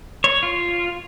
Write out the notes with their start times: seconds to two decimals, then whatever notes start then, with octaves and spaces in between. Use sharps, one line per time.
0.24 C#5
0.43 F4